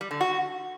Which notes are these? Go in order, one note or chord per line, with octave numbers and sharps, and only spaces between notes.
G3
D3
F#4